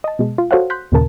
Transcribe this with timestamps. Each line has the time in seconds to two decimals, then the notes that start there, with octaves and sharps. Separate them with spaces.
0.04 D#5 A5
0.19 B2 G#3
0.38 F4
0.51 F#4 A4 C5 C#5 F5 F#5
0.70 C6 F#6 G6 B6
0.92 D#2 A#2 C#3 A#4 A5